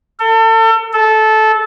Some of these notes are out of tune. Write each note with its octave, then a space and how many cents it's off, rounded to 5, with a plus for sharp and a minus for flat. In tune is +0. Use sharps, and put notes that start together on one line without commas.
A4 +35
A4 -15